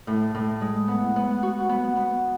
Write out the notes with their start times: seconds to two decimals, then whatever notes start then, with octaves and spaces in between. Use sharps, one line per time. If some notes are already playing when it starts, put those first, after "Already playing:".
0.07 A2
0.34 A2
0.61 G#3
0.88 B3
1.16 B3
1.43 F#4
1.69 B3
1.96 B3